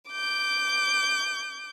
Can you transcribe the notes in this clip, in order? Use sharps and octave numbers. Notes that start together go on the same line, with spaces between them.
D6 G6